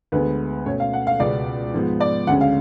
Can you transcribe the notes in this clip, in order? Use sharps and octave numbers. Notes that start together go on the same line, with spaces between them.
D2 D3 G#3 B3 B4
B2 A3 C#4 C#5
F5
F#5
F5
C#2 B2 G#3 B3 D5
G#2 F3 G#3 B3
D5
D2 C#3 G#3 C#4 F#5
F5